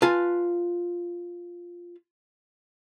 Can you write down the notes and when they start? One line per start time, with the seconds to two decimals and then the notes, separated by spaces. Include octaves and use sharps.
0.02 F4 B4 G#5 A5